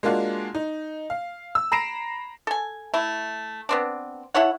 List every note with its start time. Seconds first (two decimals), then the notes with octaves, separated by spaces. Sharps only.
0.03 G#3 A#3 D4 F4 F#4
0.55 D#4
1.10 F5
1.55 E6
1.72 A#5 B5 A#6 C7 D7 E7
2.47 A4 G#5
2.94 A3 E4
3.69 B3 C4 D4
4.34 E4 A4 C#5 F#5